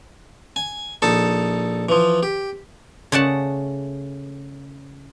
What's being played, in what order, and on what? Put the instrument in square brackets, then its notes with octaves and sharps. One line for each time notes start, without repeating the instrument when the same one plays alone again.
[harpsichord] G#5
A#1 D#4 A4 A5
E3 F3
G4
[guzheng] C#3 A3 D5 F#5 A5